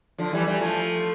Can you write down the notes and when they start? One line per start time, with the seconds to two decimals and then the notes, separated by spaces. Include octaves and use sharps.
0.18 D3 F3
0.33 E3 G3
0.47 E3 G3
0.61 F3 A3